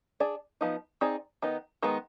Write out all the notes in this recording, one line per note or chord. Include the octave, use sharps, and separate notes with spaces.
D4 G#4 D5
F3 B3 D#4
C4 D#4 G#4 D5
D#3 B3 D#4
D#3 G#3 B3